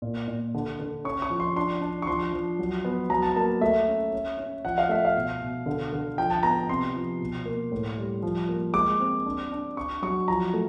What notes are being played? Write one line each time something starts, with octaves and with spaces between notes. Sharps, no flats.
A#2
A#2
D3
D3
C#4 C#6
C#6
F3
C6
D4 C6
D4
C#6
F3 C6
F3
F#3
B3
F#3 A#5
A5
A#3 A5
A3 E5
C#4
C#4
C#4
F3 F#5
F5
A3 E5
F5
B2
B2
D3
D3
F3 G5
A5
B3 A#5
C3 C6
F3
B2
A#3
A2
G3
F3
A#3
G#3 D6
C4
D4
D4
D4 C#6
F#3 C#6
F3 A#5
A3